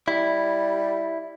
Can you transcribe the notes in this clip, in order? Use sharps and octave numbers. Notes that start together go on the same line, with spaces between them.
G3 E4